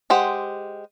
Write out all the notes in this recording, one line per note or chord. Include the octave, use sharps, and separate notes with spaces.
G#3 G4 C5 F#5